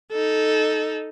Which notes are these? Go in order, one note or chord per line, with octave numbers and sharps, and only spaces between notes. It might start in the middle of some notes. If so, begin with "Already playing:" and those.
D#4 A4